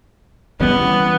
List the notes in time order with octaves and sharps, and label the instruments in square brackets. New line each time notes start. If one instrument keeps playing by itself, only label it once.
[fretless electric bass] E3 G3 C#4 [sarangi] B3